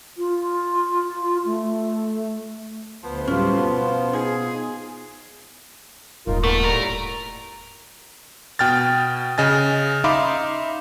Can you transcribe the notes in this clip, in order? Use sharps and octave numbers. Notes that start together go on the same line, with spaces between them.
F4
A3
D2 F3 B3 C5
A2 F#3 G3 C#4 F4
B2
D#4 G#4
D#1 G#2 D#4 F4 A#4
A3 B3 A#4
A2 G3 A#4
B2 G5 F6 A6
C#3 D#5 G#5 A6
D#4 E5 F5 B5 C6 D6